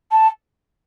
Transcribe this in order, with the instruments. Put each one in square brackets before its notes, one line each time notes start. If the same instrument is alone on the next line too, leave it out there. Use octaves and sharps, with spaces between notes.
[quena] A5